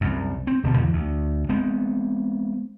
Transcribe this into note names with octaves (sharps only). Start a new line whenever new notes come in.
C2 F#2
C4
D1 G2 B2 D3
E2 D3
D2
G#3 B3 C4